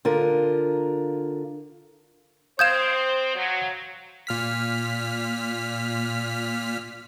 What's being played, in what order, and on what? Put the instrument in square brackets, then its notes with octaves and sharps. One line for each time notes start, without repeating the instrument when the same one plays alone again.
[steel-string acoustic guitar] D3 F4 A#4
[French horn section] C4 C5 [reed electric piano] F5 D#6 [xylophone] G6 G#6 E7
[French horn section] F#3
[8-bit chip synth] A#2 F6 B6